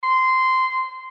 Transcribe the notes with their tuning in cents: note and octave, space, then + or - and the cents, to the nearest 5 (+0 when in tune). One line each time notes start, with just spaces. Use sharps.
C6 -15